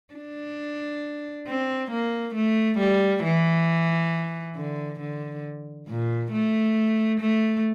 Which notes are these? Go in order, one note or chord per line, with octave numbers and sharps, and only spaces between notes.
D4
C4
A#3
A3
G3
E3
D3
D3
A#2
A3
A3